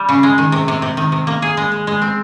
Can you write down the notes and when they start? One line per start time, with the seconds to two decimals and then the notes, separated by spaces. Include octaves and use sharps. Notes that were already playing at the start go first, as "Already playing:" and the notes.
Already playing: G3
0.09 C#3
0.23 G#3
0.38 D#3
0.52 C3
0.68 C3
0.82 C3
0.97 D#3
1.12 C3
1.27 A#3
1.42 G#4
1.57 G#3
1.72 G#3
1.87 G#3
2.02 C4